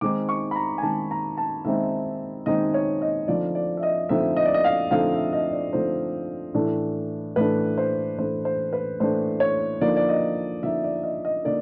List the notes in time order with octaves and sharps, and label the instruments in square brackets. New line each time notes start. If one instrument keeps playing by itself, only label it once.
[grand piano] D#3 G#3 C4 D#4 D6
C#6
B5
A#5
G#5
D#3 G#3 C4 D#4 A5
A#5
A5
D#3 G#3 C4 D#4 E5
D#3 G#3 C4 D#4 D#5
C#5
D#5
D3 F3 A3 C4 D#4 D5
D5
E5
D#5
D3 F3 A3 C4 D#4 E5
D#5
D5
D#5
F5
D3 F3 A3 C4 D#4 F5
E5
D#5
D5
D3 F3 A3 C4 D#4 C5
A2 E3 A3 D4
A2 E3 A3 D4 B4
C5
A2 E3 A3 D4 C5
C5
B4
A2 E3 A3 D4 C5
C#5
D3 F3 A#3 D#4 D5
D5
D#5
D3 F3 A#3 D#4 E5
D5
D#5
D#5
D3 A#3 D#4 D5